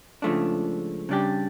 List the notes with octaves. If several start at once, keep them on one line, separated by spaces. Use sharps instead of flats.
C#2 C#3 F3 A3 D4
C#3 G3 D4 G4